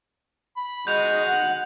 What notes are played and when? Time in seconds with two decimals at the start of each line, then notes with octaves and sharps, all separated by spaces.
0.57 B5
0.87 G#3 F#4 D#5 G6 F7
1.27 F#5